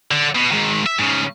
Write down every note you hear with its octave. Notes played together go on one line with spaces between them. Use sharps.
D3
B2
G#2 D#3
E5
G#2 C#3